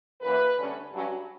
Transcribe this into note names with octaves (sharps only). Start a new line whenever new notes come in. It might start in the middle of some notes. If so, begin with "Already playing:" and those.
F#2 E3 A#3 B4
D2 D3 G3 C#4
G2 F#3 C#4